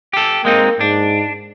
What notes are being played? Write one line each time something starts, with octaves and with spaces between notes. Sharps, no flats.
G4 A4
G#3 A#3 C4 D#4
G#2 D4